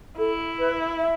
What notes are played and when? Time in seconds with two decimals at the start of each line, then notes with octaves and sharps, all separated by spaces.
0.19 E4 A4
0.59 B4
1.00 E5